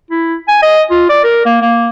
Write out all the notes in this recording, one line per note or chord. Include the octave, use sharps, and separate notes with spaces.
E4
G#5
D#5
F4
D5
A#4
A#3
A#3